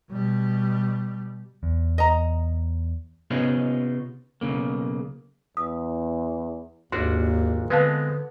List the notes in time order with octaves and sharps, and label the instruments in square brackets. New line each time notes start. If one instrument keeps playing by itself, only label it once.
[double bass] B2 G3
[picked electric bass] E2
[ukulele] D#5 A#5
[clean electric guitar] C3 B3 C#4 D#4 F4 G#4
B1 E2 C#3 A#3
[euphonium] E2 [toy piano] D#6
[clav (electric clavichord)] G#1 D4 F#4 [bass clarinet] D#2 [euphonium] A#2 [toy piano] C6
[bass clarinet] D3 [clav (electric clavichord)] G#3 B3 C4 [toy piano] B4 F5 A5